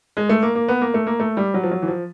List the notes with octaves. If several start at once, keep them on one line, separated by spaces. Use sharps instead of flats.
G#3
A3
A#3
A#3
B3
A#3
A3
A#3
A3
G3
F#3
F3
F#3
E3
F3